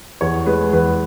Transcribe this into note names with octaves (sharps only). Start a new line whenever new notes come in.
E2 C#5
G#3 B4
E2 B4